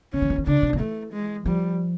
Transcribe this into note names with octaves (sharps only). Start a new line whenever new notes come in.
C#3 C#4
D#3
E3
D#3
C#3 D4
C3
F3
E3 A3
G#3
F3 G3